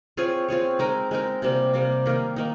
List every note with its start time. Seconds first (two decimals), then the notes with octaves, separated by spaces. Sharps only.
0.17 C4 F4 G#4 C#5
0.48 C4 F4 G#4 C#5
0.79 G#3 C4 D#4 A#4
1.11 G#3 C4 D#4 A#4
1.42 C3 G3 A#3
1.74 C3 G3 A#3
2.06 D#3 A#3 D#4
2.36 D#3 A#3 D#4